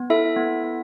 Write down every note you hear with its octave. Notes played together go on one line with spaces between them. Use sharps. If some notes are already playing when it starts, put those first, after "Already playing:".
Already playing: B3
E4 A4 E5
B3
B3